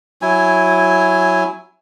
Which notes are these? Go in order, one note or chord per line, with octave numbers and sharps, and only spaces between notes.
F#3 E4 G#5